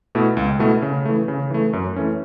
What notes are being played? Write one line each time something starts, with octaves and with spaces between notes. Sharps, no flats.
B2 A3 E4
C#2
B2 A3 E4
C#3
E3 A3
C#3
E3 A3
F#2
E3 A3 C#4